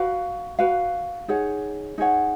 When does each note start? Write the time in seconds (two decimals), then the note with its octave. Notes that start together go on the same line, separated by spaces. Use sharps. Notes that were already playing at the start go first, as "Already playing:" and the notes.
Already playing: F#4 B4 F5
0.59 F#4 B4 F5
1.28 D#4 G#4 C#5 F#5
1.98 D#4 G#4 C#5 F#5